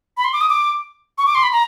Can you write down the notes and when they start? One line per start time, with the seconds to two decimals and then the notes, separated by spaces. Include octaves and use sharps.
0.17 B5
0.24 C6
0.33 D6
0.41 D#6
0.50 D6
1.18 C#6
1.27 D6
1.35 C6
1.43 B5
1.52 A#5